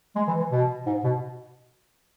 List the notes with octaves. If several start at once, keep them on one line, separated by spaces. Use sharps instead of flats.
G#3
E3
E3
B2
G#2
B2